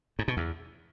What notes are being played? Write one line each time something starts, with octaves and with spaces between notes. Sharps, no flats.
G#2
B2
E2